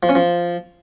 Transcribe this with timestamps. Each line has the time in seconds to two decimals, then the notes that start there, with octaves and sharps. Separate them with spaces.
0.03 F3
0.09 C#4
0.15 F3